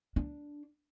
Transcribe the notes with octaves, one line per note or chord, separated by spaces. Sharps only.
D4